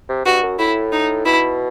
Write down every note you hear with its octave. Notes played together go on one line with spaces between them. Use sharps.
C3
G2 F#4
F#2
A2 E4
D#4
B2 E4